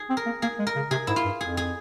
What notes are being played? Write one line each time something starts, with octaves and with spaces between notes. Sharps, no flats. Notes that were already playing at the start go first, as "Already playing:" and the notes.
Already playing: G#4
C4
A#4
A#3
A#3 G#4
G#3
A#4
C#3
C3 G#4
G#2 E4
F4
G2
F2 G#4
G#4